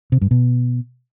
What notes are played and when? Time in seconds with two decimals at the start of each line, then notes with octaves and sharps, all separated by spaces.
0.12 C3
0.21 G2
0.31 B2